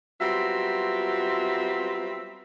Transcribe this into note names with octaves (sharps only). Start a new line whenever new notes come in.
F#3 G3 B3 C4 F4 E5